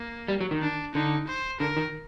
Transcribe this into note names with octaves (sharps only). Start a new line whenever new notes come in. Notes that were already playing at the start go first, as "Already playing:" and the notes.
Already playing: A#3
G3
F#3
D#3
D4
D3 D#4
C5
D3 A#4
D#3